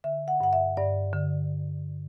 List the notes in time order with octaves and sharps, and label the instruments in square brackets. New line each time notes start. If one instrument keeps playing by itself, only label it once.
[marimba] D3 E5
F#5
G2 F#5
E5
G2 D5
D3